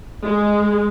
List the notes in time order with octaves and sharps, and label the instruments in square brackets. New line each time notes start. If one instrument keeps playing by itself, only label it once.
[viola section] G#3